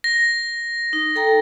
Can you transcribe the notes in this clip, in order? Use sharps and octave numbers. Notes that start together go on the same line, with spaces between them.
A#6
D#4
A4 G5 A#5